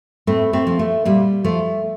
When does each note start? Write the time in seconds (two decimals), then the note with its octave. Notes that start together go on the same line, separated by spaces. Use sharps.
0.27 A2 A3 C4
0.53 A3 C4
0.67 F3
0.79 A3
1.05 A#2 G3
1.44 F3 A3